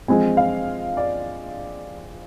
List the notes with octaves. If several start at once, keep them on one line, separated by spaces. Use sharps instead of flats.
F3 G#3 C4 G#5
F5
D5